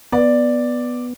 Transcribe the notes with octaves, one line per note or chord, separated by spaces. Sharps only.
B3 D5